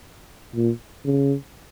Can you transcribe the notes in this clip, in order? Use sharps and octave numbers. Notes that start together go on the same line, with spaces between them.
A#2
C#3